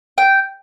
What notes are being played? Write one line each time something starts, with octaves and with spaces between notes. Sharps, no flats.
G5